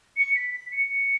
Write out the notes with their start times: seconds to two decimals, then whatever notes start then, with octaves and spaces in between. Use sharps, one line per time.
0.17 C#7
0.35 B6
0.53 B6
0.72 C#7